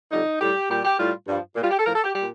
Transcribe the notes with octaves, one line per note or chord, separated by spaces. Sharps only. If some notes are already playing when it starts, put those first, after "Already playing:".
F2 D3 G3 D#4
A2 G3 G4
A#2 G3 G4
G4
A2 G3 F4
G2 F3
A#2
G3 F4
G4
A4
A2 F3 A#4
A4
G4
A#2 G3 G4